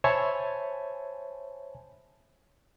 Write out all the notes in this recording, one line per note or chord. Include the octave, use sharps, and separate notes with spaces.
C5 C#5 E5 G#5 A5 B5